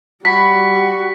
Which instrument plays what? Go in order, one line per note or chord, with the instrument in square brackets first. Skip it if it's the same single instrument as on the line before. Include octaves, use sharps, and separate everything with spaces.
[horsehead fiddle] G3 [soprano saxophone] F#4 [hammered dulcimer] B5 [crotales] B6